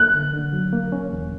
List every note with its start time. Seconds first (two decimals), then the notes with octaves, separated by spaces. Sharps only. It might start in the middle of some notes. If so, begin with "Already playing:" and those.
Already playing: A#3 F#6
0.14 D3
0.34 D3
0.53 F#3
0.73 A#3
0.92 C#4
1.12 E2